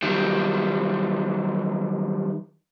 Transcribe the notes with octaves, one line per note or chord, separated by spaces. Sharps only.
D#3 F#3 G3